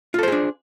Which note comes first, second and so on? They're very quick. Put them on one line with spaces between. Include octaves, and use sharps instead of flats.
F4 A4 C5 G#4 D4